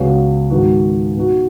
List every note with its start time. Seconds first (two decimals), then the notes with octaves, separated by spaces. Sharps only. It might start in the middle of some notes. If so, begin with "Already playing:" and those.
Already playing: C#2 C#3 B3 F#4
0.50 G#2 D#3 B3 F#4
1.17 B2 B3 D#4 F#4